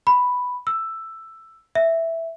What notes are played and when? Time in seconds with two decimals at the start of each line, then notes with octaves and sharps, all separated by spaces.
0.07 B5
0.67 E6
1.75 E5